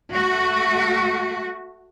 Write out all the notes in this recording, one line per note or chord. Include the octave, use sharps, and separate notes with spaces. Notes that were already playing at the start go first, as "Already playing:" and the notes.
A3 F#4